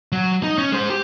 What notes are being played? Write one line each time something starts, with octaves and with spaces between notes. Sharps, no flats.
F#3
D#4
C#4
G#3 C5
G4